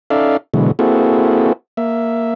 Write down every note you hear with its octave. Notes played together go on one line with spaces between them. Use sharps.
C#4 D#4 A4 D5 E5 F5
B2 D3 E3 F#3 G#3
A#3 C4 E4 F#4 G#4 A4
A#3 E5